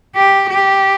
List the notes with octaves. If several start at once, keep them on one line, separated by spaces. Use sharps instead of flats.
G4
G4